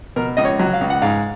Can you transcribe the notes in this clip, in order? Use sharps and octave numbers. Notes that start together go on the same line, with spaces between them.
B2 A#4
C#2 D#5
C#5
F#3
F5
C#2
F#5
G#2 F5